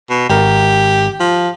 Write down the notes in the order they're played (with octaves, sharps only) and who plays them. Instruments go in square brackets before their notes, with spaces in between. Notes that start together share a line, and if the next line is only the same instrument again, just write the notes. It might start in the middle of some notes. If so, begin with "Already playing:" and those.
[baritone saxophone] B2
[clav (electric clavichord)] G#1 A#4 [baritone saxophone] G4
[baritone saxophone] F3